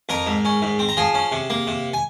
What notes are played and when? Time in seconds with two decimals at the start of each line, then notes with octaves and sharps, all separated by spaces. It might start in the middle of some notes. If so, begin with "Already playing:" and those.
0.09 F2 A#4 A#5
0.27 G#2
0.45 C#4
0.62 G#2
0.79 C4
0.89 A#5
0.97 F3 G#4 G#5
1.14 C#4
1.32 C3
1.50 A#3
1.67 C3
1.94 G#5